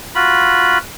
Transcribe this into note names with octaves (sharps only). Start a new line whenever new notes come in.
F4 F#4 B5